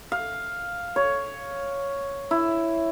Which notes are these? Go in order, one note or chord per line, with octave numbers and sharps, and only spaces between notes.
F5
C#5
E4